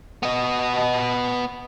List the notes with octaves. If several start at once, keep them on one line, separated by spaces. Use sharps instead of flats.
B3 D#5